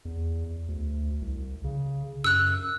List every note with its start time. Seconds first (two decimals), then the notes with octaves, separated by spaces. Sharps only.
0.05 E2
0.68 D2
1.21 C2
1.64 C#3
2.24 F#2 E6 F#6